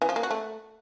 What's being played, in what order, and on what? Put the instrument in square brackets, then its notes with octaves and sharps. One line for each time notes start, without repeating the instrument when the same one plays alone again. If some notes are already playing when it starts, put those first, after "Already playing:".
[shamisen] E3
F3
A#3
F#4
A3